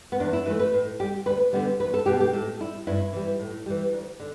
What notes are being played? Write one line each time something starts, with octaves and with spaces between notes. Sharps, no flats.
B3
E2 D4
E4
E3 A3 B4
B4
A2
G3 G4
D2 B4
D3 G3 B3
E2 B4
A4
B2 A3 G4
G4
A2 A4
G3 E4
G2 E4
E3 G3
A2
E3 G3
D2
D3